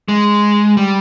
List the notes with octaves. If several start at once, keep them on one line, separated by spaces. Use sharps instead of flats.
G#3
G3